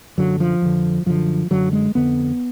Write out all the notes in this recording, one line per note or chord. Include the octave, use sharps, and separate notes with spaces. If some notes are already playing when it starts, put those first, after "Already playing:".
F#2 D3 F#3
F3
F2 D3
F#2 D3 F3
F#2 D3 F#3
G#3
F2 D3 B3